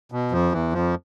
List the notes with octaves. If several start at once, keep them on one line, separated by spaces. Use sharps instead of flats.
B2
F2 F3
E2 E3
F2 F3